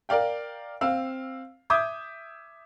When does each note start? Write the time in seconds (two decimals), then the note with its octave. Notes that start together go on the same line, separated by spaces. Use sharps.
0.09 A#4 D5 F5 G5
0.81 C4 F5 E6
1.70 E5 D6 D#6 G6 G#6